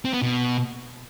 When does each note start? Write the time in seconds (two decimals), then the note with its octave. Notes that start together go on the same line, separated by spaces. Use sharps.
0.05 C4
0.14 B3
0.22 B2